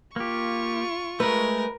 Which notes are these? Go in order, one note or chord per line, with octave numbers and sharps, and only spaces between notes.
A#3 F4 G4 C#6
G#3 A3 A#4 B4